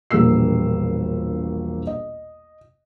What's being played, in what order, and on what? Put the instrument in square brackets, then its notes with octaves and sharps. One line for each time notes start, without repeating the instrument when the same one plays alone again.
[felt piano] E1 A#1 G3 A#3 E6 C7
D#5